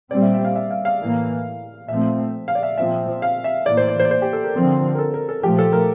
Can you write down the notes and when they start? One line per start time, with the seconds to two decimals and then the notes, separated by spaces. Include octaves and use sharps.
0.11 A#2 G3 C4 D5
0.22 E5
0.34 E5
0.45 F5
0.56 E5
0.71 F5
0.85 F5
1.00 A2 E3 A#3
1.88 A#2 F3 A3 C4 E5
2.48 F5
2.55 D5
2.63 E5
2.77 A#2 F3 C4 E5
3.22 F5
3.44 E5
3.66 A2 E3 A#3 D5
3.77 C5
3.88 D5
4.00 C5
4.05 D5
4.11 C5
4.22 G4
4.33 A4
4.44 A#4
4.54 D3 F3 C4
4.95 A#4
4.98 A4
5.14 A#4
5.29 A4
5.43 A#2 F3 A3 G4
5.59 A4
5.73 A#4